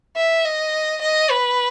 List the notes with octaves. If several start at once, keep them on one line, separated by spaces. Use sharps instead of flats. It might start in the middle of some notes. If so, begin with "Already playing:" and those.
E5
D#5
D#5
B4